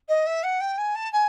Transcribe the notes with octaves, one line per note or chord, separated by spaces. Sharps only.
D#5
E5
F#5
G5
G#5
A5
G#5